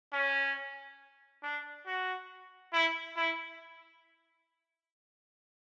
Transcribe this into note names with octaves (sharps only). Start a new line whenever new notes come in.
C#4
D4
F#4
E4
E4